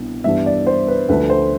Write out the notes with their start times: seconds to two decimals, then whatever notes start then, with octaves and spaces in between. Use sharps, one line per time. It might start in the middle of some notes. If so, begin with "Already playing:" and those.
Already playing: C2 B2 B3 D4
0.24 G2 E3 G3 B3 D4 E5
0.46 D5
0.67 C5
0.88 B4
1.09 D2 D3 F3 A3 B4
1.30 C5